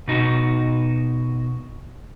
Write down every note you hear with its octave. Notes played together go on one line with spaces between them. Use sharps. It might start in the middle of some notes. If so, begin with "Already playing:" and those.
B2 D#4 F#4